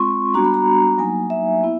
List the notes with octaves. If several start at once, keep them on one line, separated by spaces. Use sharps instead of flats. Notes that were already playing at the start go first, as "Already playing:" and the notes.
Already playing: G#3 C4 F4 C6 C#6
G3 B3 D4 F#4 A#5
B5
A#5
F#3 A#3 D#4 G#5
E5
B3 E4